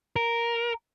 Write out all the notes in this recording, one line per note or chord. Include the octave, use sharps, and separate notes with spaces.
A#4